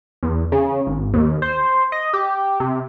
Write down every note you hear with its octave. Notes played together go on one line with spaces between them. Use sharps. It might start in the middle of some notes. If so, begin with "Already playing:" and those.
E2
C#3
G#1
D#2
C5
D#5
G4
C3